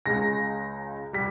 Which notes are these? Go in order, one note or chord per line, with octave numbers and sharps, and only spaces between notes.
C#2 C#3 G#3 A#6
G3 B6